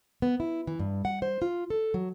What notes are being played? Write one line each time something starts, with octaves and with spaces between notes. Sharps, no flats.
B3
E4
E3
G2
F#5
C5
F4
A4
F#3